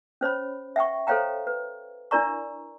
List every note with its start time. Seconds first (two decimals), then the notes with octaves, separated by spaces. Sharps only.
0.21 C#4 C5 C#5 B5
0.76 E5 F#5 G5 C#6
1.07 A4 C5 C#5 F5 G5 A#5
1.47 B4
2.11 D4 E4 A#4 D5 A#5 C#6